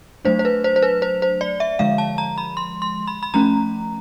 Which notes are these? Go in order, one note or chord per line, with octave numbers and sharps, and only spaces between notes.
F#3 A3 D4 C5
C5
B4
C5
C5
B4
C5
C5
D5
E5
D3 F3 G#3 F5
A5
A#5
B5
C6
C6
B5
B5
F3 A3 C#4 A#5